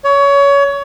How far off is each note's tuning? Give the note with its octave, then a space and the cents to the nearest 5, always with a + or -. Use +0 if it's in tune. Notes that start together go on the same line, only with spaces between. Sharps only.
C#5 +25